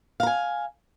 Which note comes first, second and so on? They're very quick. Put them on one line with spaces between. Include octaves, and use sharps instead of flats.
F5 A#5 G#5